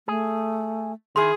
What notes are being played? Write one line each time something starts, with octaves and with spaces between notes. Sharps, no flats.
A3 G#4
D#3 E4 G#4 C6